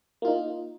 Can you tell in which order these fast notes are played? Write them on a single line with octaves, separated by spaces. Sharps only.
A#3 F4 D#4